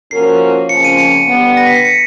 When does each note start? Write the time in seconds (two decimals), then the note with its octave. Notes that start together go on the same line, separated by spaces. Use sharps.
0.11 F3 A#3 C#4 F#4 A#4 C7
0.69 F2 C#3 F3 A#3 C#4 C#7
0.84 D#7
0.98 C#7
1.27 D3 G3 B3
1.57 A#6
1.67 B6
1.75 C7
1.85 C#7